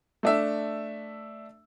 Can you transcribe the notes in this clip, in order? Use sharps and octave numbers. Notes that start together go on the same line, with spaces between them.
A3 D4 E5